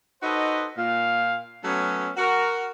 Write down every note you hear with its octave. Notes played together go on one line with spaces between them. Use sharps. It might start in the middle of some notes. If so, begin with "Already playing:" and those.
D#4 F#4 A4 B4 C5 D#5
A#2 F5
F#3 A3 B3 C#4
F#4 A#4